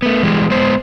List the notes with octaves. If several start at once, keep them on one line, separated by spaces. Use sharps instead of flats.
A3 B3
E3 G3 G#3
G#3 B3 C5